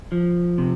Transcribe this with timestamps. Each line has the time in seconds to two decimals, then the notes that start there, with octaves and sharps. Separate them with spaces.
0.12 F3
0.58 C3